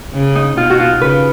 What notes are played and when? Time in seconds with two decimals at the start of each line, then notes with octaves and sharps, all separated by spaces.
0.14 C#3
0.35 D#4
0.57 B2 F4
0.70 F#4
0.79 F4
1.01 C#3 B4